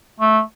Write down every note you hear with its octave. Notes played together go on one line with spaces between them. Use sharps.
A3